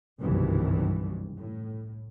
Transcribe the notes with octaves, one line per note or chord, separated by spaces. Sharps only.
F#1 C2 G2 B2 D#3 E3
A2